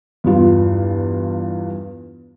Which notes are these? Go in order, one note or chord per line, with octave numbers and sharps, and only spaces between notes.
E2 G2 F4